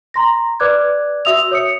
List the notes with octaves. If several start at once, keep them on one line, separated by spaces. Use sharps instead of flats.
A#5 C6 A#6
B4 D5 D6 F#6 G#6
F#4 E5 D#6 E6 F7
C#5 D#6 C#7